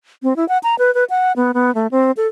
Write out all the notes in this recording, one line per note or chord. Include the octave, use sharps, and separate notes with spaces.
C4
E4
F#5
A#5
B4
B4
F#5
B3
B3
A3
C4
A4